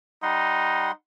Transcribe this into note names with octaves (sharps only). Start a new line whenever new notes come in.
G3 D#4 F#5 C6